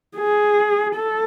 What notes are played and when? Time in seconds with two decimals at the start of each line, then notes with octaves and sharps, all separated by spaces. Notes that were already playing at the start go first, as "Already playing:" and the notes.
0.16 G#4
0.95 A4